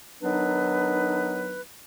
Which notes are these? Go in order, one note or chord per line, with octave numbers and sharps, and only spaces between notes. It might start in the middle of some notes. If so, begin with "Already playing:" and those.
D#3 F#3 B3 D4 D#4 B4